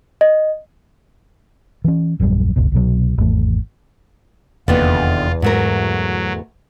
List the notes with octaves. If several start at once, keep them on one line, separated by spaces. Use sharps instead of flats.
D#5
E3 C#4
D#1 A#1 F#2 G3
F#1 C#2 B2
C2 B2 F#3
G#1 E2 A3
F1 E2 D3 D#3 A#3 B3 F4
D2 G#2 F#3 G#3 A3 A#4